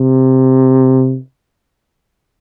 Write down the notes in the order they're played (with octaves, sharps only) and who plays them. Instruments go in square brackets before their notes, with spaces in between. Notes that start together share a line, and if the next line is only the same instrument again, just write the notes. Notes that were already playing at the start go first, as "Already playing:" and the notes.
Already playing: [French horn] C3